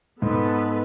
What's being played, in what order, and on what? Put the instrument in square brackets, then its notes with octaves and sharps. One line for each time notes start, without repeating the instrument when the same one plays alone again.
[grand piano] G#2 [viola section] B3 A4 B4